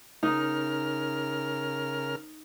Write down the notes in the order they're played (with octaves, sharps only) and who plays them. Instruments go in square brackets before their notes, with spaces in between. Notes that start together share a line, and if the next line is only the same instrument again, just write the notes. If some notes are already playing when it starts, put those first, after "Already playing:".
[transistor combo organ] C#3 A#4 F6 [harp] D#4